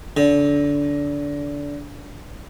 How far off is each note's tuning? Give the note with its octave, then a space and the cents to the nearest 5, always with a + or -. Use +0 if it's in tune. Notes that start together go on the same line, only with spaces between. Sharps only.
D3 -25